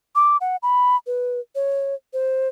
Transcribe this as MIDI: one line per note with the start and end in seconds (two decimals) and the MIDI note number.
0.15 0.37 86
0.41 0.56 78
0.63 0.96 83
1.07 1.40 71
1.55 1.95 73
2.13 2.48 72